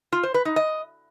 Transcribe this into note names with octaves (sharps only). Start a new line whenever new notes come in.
F4
C5
B4
D#4
D#5